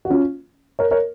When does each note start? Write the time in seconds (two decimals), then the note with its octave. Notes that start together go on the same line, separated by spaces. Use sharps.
0.05 F#4
0.10 C#4 F4
0.79 A#4 C#5
0.91 A#4 C#5